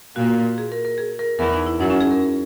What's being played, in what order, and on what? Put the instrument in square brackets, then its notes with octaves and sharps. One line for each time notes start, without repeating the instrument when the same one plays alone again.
[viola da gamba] A#2 A#3 [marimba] F#4
[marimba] G#4
A#4
A#4
G#4
A#4
[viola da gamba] E2 E3 [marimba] A#4
[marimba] D#4
E4
[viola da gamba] F#2 F#3 [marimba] D#4
[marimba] C#4
G#4
A#4